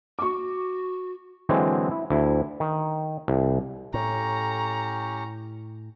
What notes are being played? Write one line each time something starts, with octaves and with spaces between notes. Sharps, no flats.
F#4 C#6 D6
D3 E3 F#3 G#3 C4
E4
D2 E4
D#3
C2
A2 C#4 G4 A#5 C#6